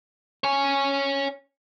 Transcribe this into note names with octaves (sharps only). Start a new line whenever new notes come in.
C#5 G#5